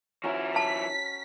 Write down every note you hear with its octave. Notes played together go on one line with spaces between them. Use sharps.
F3 C#4 E4 F#4 A#4
A5 B6